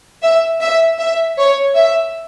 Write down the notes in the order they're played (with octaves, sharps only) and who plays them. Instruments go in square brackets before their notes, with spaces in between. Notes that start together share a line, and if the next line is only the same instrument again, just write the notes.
[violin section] E5
E5
E5
C#5
E5